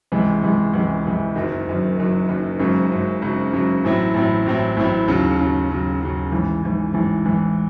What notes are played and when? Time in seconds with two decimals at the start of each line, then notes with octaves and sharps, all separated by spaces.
0.12 C#2 C3 E3 G#3
0.43 C#2 C3 E3 G#3
0.74 C#2 C3 E3 G#3
1.05 C#2 C3 E3 G#3
1.36 F#1 F#2 D#3 F#3
1.67 F#1 F#2 D#3 F#3
1.97 F#1 F#2 D#3 F#3
2.29 F#1 F#2 D#3 F#3
2.60 G#1 F#2 C#3 F#3
2.91 G#1 F#2 C#3 F#3
3.22 G#1 F#2 C#3 F#3
3.53 G#1 F#2 C#3 F#3
3.84 A1 A2 F#3 C4 E4
4.14 A1 A2 F#3 C4 E4
4.46 A1 A2 F#3 C4 E4
4.77 A1 A2 F#3 C4 E4
5.08 D#2 C#3 F#3
5.39 D#2 C#3 F#3
5.70 D#2 C#3 F#3
6.01 D#2 C#3 F#3
6.32 A1 G#2 E3
6.63 A1 G#2 E3
6.94 A1 G#2 E3
7.25 A1 G#2 E3